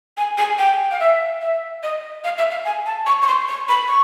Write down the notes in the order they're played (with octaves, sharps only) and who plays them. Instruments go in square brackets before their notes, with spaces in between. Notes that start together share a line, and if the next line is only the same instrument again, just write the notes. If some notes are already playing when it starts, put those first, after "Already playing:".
[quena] G#5
G#5
G5
F5
E5
E5
D#5
F5
E5
F5
G#5
A5
C#6
C#6
C6
C#6
B5
C#6